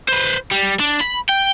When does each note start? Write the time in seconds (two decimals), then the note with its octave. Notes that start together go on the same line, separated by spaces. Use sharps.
0.08 B4 C5
0.52 G3
0.80 D4
1.01 B5
1.29 G5